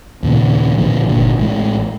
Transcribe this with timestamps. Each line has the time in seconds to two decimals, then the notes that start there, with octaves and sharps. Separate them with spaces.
0.23 D#2 A#2 C#3
0.78 A1 A#2 D3 F3
1.09 G1 C2 A#2 D3
1.38 A1 G#3